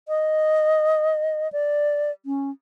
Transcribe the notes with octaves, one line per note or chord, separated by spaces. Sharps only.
D#5
D5
C#4